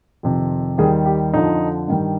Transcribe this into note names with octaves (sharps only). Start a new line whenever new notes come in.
F2 C3 D#3
D#2 D#3 G3 G#4
G4
F2 D3 F3 D#4
G2 D#3 G3